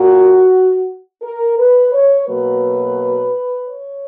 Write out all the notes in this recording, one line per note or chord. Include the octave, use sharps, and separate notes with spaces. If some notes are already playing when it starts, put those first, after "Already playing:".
Already playing: A#2 A#3 F#4
A#4
B4
C#5
B2 F#3 A#3 B4
C#5